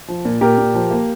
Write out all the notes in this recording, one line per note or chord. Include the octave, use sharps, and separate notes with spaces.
F3
A#2
A#2 G4 A#4
A#2
F3
A#3